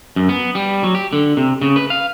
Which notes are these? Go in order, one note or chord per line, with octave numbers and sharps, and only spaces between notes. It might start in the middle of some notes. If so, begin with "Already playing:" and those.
F#2
B3
G3
F#3
G4
D3
C3
C#3
B4
F5